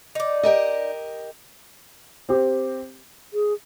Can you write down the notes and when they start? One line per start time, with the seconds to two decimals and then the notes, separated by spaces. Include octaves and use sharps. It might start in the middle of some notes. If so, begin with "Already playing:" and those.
0.15 D#4 D5
0.43 G4 A#4 D#5
2.29 C4 G4
3.33 G#4